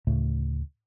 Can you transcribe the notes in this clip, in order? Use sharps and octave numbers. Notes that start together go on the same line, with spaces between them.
D2 A2 C#3 A3